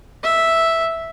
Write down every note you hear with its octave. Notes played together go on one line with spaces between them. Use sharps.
E5